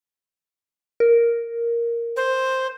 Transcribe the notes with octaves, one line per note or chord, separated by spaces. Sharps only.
A#4
C5